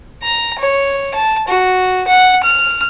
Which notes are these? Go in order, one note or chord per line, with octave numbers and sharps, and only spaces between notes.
A#5
C#5
A5
F#4
F#5
F6